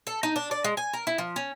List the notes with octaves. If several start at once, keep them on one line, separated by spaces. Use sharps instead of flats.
A4
D#4
D4
D5
G#3
G#5
A#4
E4
F3
C#4